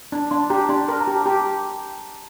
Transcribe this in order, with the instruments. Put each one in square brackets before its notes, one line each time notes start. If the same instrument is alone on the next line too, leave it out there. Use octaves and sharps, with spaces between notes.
[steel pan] D4
[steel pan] D4 [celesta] C6
[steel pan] G4 [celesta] A#5
[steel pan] D4 [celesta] C6
[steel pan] A#4 [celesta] C6
[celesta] A#5
[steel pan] G4
[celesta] A5
[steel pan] G4 [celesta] A#5